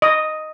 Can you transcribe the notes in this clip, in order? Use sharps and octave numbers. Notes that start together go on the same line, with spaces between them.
D#5